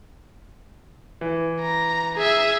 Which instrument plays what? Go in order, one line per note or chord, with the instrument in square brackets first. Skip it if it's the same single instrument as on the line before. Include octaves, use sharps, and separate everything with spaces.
[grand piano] E3
[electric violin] A#5
G#4 E5